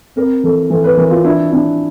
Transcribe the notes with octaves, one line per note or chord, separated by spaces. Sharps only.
C4 A#4
E3 A4
E3 A4
B4
E3 A#4
F4
D4 E4
D4 E4